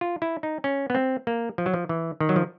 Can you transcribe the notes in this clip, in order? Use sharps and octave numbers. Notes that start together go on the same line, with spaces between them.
F4
E4
D#4
C#4
B3
C4
A#3
F3
F#3
F3
E3
D#3
F#3
F3